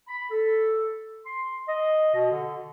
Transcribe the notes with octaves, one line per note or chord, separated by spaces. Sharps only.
B5
A4
C6
D#5
B2
D3